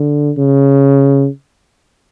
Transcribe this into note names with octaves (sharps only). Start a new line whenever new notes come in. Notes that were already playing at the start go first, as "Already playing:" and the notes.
Already playing: D3
C#3